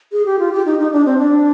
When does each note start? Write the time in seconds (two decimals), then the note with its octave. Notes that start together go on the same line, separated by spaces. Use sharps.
0.12 G#4
0.26 G4
0.39 F4
0.52 G4
0.66 D#4
0.79 D#4
0.93 D4
1.06 C4
1.18 D4